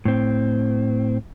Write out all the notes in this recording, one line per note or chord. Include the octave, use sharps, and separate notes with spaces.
A2 C4